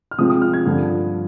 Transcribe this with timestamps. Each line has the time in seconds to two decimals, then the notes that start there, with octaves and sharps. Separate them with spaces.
0.11 F6
0.18 C3 F3 G#3 C4 D#6
0.30 D#6
0.42 F6
0.53 G#6
0.66 G2 D3 F3